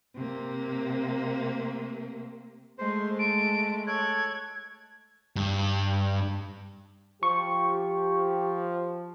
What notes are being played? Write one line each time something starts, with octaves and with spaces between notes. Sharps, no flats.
C3 A#3
G#3 A3 C5
A5 D7
A4 C#5 F#6 G#6
G2
F3 G4 C#6